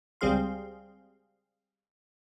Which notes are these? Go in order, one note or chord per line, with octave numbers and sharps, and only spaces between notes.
C#2 G3 C4 G#4 F5 C6